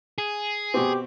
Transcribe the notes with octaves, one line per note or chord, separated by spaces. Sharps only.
G#4
B2 C4 G4